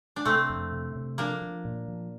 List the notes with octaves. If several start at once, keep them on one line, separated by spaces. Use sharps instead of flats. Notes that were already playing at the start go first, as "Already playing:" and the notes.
D4
C3 A3 C4
F2
C3
C3
F3 A#3 D4
F3
A#2
F3